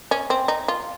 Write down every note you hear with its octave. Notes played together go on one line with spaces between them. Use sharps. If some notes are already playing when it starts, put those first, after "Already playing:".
C#4
C4
D#4
F4